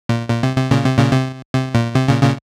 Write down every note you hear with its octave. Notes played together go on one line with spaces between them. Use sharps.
A#2
A#2
C3
C3
A#2 C#3
C3
A#2 C#3
C3
C3
A#2
C3
A#2 C#3
A#2 C#3